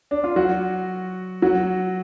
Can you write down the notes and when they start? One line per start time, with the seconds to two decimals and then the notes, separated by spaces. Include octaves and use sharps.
0.11 D4
0.24 F4
0.36 F#3 F#4
1.42 F#3 F#4